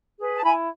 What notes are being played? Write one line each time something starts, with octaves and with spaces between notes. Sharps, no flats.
G#4 B4
A5
E4 G#5 B5